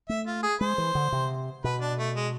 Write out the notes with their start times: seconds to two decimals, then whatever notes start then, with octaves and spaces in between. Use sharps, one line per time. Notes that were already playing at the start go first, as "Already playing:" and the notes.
0.09 A3 E5
0.27 F4
0.43 G#4
0.61 G#3 C5
0.78 E3
0.95 D3
1.12 C3
1.64 B2 B4
1.81 D4
1.99 A3
2.16 G#3